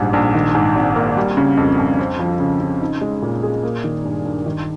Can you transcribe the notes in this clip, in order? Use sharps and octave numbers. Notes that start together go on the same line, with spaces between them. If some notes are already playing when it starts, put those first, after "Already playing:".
Already playing: A#1 G#2 G3
A#1
D#3
G#2
G#1
A#3
G3
C#3
F2
F2
C4
F3
C#3
C#3
D#4
G#3
A#2
G#4
A#3
D#3
G2
G2
D#3